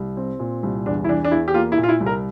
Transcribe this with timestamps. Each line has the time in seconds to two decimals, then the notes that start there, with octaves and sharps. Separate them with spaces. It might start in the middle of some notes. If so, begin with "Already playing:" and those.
Already playing: C2
0.17 C4
0.39 A#2
0.63 C2
0.86 E2 D4
1.04 E4
1.09 E3 D4
1.24 D4
1.31 E2 E4
1.48 G4
1.54 A#3 F4
1.72 E4
1.78 A#2
1.83 F4
1.89 E4
2.01 C2
2.06 A#4